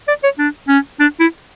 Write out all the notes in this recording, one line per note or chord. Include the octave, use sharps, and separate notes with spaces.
D5
C#5
D4
C#4
D4
E4